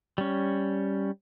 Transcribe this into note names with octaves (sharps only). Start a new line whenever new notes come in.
G3 C#4